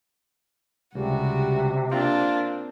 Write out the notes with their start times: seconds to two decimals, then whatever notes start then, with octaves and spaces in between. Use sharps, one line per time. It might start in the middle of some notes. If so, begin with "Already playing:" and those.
0.95 C#2 C3 G3 F#4
1.91 A#3 C4 D4 F4